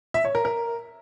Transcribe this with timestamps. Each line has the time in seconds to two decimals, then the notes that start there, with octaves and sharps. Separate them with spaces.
0.14 E5
0.25 C#5
0.35 A#4
0.45 A#4